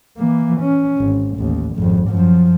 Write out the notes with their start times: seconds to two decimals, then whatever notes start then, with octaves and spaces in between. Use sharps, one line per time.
0.18 E3 A#3
0.60 C#4
0.98 G#1
1.37 A1 D#2
1.75 G#1 F2
2.09 F#2 F3